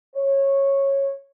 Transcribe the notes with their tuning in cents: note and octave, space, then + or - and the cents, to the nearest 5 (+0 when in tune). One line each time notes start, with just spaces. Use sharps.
C#5 -15